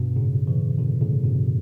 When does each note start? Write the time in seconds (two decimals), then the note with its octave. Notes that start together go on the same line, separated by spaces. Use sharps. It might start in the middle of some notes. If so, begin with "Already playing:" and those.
Already playing: G2 B2
0.16 A2 C#3
0.47 C#3 E3
0.78 B2 D3
1.01 A2 C#3
1.24 G2 B2